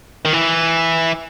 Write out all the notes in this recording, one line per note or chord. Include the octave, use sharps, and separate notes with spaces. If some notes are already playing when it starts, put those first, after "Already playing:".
D#3
E3